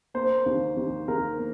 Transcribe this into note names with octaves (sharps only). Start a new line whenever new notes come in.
A#3 C5
D#2
D#2
D#2 A#4
A#3